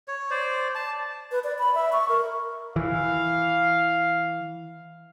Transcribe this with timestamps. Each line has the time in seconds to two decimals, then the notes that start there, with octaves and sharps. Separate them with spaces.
0.08 C#5
0.31 C5 D5
0.75 A5
1.31 B4
1.44 D5
1.59 B5
1.75 E5
1.92 C#6
2.09 A#4
2.76 E3 F5